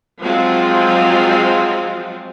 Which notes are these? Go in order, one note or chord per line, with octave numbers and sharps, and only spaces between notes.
F3 F#3 G#3 C4 F4 F#4